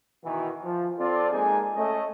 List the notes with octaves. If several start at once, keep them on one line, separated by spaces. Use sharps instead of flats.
B2 D#3 E3 F#4
F3
C4 F4 A4 D5
G#3 A#3 D#4 G#4 D5 G#5
A3 C#4 D#5